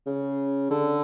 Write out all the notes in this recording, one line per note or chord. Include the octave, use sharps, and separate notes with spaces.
C#3
D3